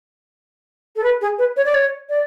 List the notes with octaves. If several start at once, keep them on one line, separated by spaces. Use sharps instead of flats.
A4
B4
G#4
B4
C#5
D5
C#5
D5